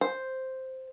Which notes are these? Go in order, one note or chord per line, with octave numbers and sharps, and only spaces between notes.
C5